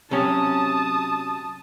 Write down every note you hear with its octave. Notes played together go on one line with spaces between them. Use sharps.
C3 F#3 C#4 A5 D#6